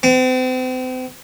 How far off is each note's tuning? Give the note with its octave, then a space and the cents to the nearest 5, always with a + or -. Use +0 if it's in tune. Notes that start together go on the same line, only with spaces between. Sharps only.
C4 -40